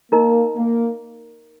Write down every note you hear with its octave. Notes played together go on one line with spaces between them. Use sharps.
A#3 D#4 A#4 D#5 A#5
A#3